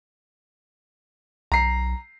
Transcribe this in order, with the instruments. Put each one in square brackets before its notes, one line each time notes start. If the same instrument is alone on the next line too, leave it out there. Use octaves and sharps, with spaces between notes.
[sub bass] B1 [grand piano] A#5 C7